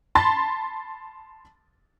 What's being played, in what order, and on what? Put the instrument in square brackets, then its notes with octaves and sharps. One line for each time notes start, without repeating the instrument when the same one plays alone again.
[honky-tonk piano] A5 B5 C6 A6